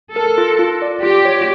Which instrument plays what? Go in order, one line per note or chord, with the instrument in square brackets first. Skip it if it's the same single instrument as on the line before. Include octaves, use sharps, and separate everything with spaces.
[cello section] A4 [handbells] A#4
[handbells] F4
F4
D5
[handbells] F4 [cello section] G4
[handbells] C#5